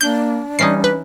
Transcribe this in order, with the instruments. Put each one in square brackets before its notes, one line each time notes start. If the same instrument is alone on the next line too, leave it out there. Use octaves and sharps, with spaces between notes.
[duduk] A#3 [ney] D4 [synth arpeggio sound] G6
[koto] E3 C#4 D#4 [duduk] G3 [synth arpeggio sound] C7
[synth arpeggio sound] B4